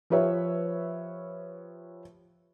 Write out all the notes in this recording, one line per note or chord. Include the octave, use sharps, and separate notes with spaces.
F3 G4 B4 C#5 E5